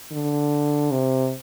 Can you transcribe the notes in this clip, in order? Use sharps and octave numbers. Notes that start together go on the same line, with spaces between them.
D3
C3